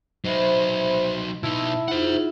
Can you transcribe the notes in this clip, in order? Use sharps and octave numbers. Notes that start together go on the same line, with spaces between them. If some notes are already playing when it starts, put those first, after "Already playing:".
F#3 D#4 C5 E5 B5
B2 D#4 E4 A5
D#4 F4 G#4 C5 F#5